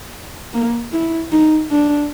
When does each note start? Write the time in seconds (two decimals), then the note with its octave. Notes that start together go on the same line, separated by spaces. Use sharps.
0.54 A#3
0.92 E4
1.32 D#4
1.70 D4